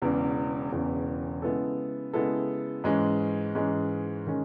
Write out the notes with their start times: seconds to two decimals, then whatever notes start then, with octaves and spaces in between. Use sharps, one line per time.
0.02 E1 E2 C#3 E3
0.72 E1 E2 C#3 E3
1.42 C#3 G#3 B3 E4 A4
2.13 C#3 G#3 B3 E4 A4
2.84 G#2 E3 G#3 C#4
3.55 G#2 E3 G#3 C#4
4.27 D#3 G#3 C#4